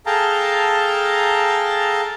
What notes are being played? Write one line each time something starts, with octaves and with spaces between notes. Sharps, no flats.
G#4 A4 F5 G5 A5 A#5